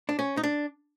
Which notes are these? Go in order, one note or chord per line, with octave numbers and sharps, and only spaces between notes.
D4
C#4
D#4
D4